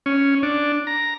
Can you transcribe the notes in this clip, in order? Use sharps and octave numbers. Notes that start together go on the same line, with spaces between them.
C#4
D4
A#5